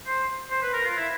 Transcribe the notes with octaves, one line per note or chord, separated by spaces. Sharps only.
C5
C5
B4
A#4
F4
E4